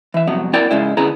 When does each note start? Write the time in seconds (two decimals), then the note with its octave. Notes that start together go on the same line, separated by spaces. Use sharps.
0.14 E3 E5
0.28 C2 F2 F#3 B3
0.53 B3 E4 A#4 D5 G5
0.71 G#2 C#3 G#3 E4
0.97 D3 B3 C#4 E4 G#4 A#5